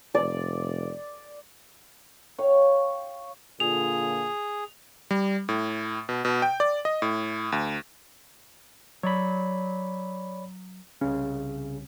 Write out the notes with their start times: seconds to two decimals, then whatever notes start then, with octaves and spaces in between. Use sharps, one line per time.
0.15 F1 D5
2.39 C#5 F5 G5 C#6
3.60 A#2 D3 F4 G#4 F7
5.11 G3
5.49 A2
6.09 B2
6.25 B2
6.42 G5
6.60 D5
6.85 D#5
7.02 A2
7.52 D2
9.03 F#3 C#5 D5 B5
11.01 C2 C#3 C#4